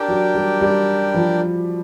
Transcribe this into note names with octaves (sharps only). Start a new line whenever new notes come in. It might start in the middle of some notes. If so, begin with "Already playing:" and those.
Already playing: D4 G4 A#4 D5 G5
F#3
G3
G3
F3